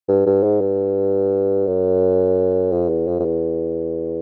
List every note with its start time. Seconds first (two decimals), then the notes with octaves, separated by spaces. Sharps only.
0.08 G2
0.27 G2
0.43 G#2
0.61 G2
1.67 F#2
2.72 F2
2.89 E2
3.07 F2
3.20 F2
3.25 E2